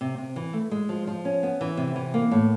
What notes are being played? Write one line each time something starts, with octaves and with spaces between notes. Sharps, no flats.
C3
C3
E3
A3
G#3
F3
F3
C#4
B3
E3
C3
E3
A#3
A2